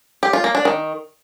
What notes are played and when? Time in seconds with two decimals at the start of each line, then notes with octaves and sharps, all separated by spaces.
0.23 G4
0.33 F4
0.44 A#3
0.55 D4
0.65 D#3